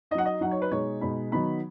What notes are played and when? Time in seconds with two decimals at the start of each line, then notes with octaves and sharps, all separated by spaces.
0.11 D#4 D#5
0.15 F#3 F#5
0.25 D#5
0.41 F#3 D#4 F#5
0.51 C#5
0.62 B4
0.71 B2 G#3 D#4 C#5
1.01 B2 G#3 D#4 B5
1.32 D#3 F#3 B3 D#4 B5